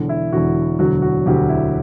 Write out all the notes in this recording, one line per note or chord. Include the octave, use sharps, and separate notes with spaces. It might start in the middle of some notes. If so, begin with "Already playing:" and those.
Already playing: E1 E2 D3
E4
E1 E2 D3 F#4
E1 D2 D3 F#3 F#4
F#4
E1 D2 D3 F#3 G4
E4